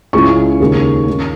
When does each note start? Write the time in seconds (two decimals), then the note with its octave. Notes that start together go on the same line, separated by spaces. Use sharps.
0.13 C#2 C#3 G#3 C#4 E4 C#6
0.60 D#2 C#3 G#3 D#4
1.08 D#3 G#3 C#4